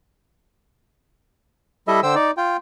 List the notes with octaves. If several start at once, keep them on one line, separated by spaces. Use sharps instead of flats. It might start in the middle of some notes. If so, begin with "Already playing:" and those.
G3 E4 A4 D#5 E5
D3 C5 G5 E6
D#4 D5
F4 G5